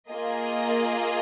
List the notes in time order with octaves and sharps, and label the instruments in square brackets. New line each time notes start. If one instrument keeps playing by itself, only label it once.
[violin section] A#3 F4 G#4 D#5